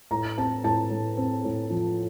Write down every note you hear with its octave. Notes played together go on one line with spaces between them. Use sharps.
A2 A#5
C4 A5
A2 A5
A2
C4
A2
F3